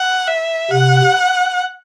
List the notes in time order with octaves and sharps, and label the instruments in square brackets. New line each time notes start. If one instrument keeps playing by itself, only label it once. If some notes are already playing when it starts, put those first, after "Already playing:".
Already playing: [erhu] F#5
E5
[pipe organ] C3 [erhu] F#5